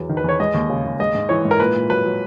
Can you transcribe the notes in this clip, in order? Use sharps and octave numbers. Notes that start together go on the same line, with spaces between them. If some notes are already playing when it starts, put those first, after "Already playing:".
Already playing: E2 F#3
D#3
B4
E2 C#5
G#3 D#5
D#2
C#3
D#2
G#3 D#5
G#2
E3 C#5
G#2
A#4
A#2 B4
A#2
F#3 B4
F#3